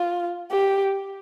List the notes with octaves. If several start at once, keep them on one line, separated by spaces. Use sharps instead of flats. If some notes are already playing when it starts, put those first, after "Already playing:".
Already playing: F4
G4